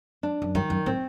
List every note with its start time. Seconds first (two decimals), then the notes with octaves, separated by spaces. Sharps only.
0.23 D4
0.42 F#2
0.55 G2 D#3
0.70 F#2
0.86 A2 C4